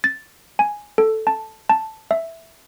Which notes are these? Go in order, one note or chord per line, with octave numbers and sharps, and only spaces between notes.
A6
G#5
A4
A5
A5
E5